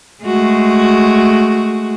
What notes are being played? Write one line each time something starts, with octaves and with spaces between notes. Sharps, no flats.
G#3 A3 F#4